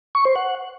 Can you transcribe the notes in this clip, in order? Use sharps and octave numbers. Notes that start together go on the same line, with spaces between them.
C#6
C5
F#5